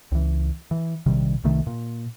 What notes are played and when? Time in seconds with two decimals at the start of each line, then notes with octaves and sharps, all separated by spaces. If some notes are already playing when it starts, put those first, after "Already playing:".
0.12 C#2 E3
0.71 E3
1.06 A#1 C3 D#3 G3
1.44 C2 C3 D#3 A3
1.67 A#2